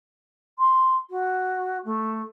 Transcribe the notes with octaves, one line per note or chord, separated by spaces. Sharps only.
C6
F#4
A3